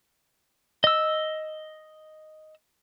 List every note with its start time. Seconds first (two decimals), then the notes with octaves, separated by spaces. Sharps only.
0.84 D#5 E6